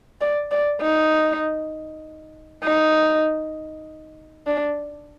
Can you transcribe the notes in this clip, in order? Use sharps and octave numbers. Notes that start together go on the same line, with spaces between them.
D5
D5
D#4
D#4
D4